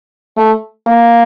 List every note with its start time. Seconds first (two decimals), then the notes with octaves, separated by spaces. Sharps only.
0.37 A3
0.87 A#3